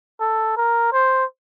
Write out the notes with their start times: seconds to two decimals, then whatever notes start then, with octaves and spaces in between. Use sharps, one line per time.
0.20 A4
0.57 A#4
0.93 C5